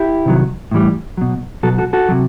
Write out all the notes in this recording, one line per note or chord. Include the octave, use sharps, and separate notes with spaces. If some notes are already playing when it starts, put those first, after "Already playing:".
Already playing: E4 G4
C3 D#3 F#3
A2 E3 G3
B2 F#3
B2 F#3 F#4 A4
F#4 A4
F#4 A4
C3 F#3